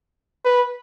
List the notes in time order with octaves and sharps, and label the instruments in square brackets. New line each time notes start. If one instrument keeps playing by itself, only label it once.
[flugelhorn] B4